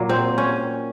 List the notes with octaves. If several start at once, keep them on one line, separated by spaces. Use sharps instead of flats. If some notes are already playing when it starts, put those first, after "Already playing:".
Already playing: A#2 F#3 A#3
C4
C#4